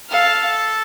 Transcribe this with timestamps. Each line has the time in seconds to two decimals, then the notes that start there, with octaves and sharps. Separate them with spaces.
0.11 A4 F5